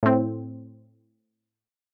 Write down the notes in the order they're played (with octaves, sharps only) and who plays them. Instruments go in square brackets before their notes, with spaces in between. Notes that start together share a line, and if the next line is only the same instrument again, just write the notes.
[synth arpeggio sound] A2 C4